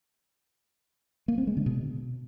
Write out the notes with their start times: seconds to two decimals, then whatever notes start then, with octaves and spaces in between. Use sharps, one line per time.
1.28 A#3
1.38 C4
1.47 G#3
1.57 D3
1.66 B2